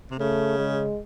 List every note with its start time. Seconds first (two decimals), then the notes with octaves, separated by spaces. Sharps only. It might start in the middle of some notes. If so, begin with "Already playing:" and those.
0.11 C3
0.19 C#3 A3
0.58 G#3